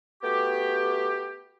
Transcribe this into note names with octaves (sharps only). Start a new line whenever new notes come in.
A3 B3 F#4 G4